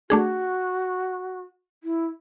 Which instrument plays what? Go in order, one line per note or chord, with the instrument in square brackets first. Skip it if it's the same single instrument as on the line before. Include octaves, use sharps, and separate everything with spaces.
[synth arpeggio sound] A3 D4 G#4 [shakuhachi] F#4
[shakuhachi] E4